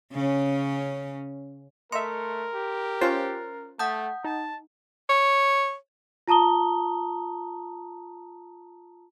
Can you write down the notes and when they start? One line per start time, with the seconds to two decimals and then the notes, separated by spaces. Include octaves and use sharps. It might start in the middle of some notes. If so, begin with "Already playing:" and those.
0.13 C#3 C#4
1.92 A3 A#4 D#5 E5 C6 C#7
2.54 G4
3.01 C#4 F4 C5 F#6 A6 C7
3.79 A3 F#5 A5 D#6 G6
4.25 D#4 A5
5.09 C#5
6.28 F4 A5 A#5 D#6 G7